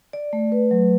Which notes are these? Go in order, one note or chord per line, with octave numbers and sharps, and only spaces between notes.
D5
A3
B4
F#3